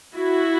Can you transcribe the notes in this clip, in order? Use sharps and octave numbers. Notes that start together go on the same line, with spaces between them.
E4 F#4